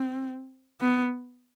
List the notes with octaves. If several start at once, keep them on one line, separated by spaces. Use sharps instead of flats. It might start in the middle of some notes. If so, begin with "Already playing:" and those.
Already playing: C4
B3